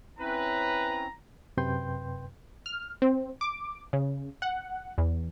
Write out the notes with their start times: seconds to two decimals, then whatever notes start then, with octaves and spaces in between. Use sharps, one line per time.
0.19 C4 C#4 E4 B4 A#5
1.57 F#2 C3 B4 G5 C6 G6
2.66 F6
3.02 C4
3.41 D6
3.93 C#3
4.42 F#5
4.98 E2